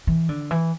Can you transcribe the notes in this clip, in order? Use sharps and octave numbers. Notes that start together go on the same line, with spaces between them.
E3
D3
E3